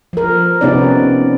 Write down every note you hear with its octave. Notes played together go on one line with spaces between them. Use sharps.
F3 A#4
C3 B3 C#4 D#4 D5